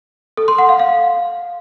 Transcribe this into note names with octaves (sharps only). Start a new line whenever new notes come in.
A4
C6
F#5
F5
F5